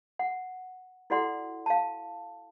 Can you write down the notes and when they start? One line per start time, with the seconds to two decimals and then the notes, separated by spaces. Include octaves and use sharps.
0.19 F#5
1.10 E4 F#4 A4 D5 F#5 C6
1.66 F5 A5